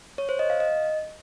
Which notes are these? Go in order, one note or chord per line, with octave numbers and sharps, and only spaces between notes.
C#5
C5
D#5
F5
D#5